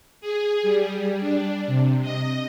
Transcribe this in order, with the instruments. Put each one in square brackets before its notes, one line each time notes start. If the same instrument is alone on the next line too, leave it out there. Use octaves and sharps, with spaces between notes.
[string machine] G#4
G3
D4
C3
D#5